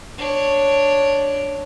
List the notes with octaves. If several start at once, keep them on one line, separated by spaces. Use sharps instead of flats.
D4 C#5